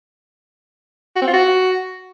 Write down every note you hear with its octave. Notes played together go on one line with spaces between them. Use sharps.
F#4
C4
F4
F#4